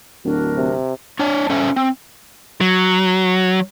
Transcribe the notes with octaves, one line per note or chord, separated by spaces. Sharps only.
D1 D4 F#4 A#4
C3
D4 C#5 A5
C#4 A4 C5 E5
C4
F#3